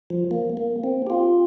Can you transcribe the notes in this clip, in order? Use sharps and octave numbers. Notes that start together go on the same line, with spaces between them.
F3
A#3
A#3
C4
G4
F4